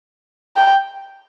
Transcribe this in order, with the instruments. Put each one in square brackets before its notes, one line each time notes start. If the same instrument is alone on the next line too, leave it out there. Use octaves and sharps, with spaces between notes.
[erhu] G5